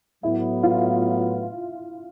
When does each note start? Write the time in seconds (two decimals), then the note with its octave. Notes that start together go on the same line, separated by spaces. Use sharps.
0.23 A2 F#3 B3 E4
0.63 F4